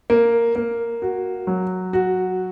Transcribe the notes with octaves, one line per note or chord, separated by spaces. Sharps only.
A#3
A#3
F#4
F#3
F#4